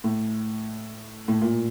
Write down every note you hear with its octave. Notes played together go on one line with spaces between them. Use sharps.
A2
A2
A#2